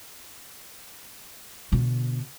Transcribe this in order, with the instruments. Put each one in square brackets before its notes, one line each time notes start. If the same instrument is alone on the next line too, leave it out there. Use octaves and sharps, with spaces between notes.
[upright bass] B2 D3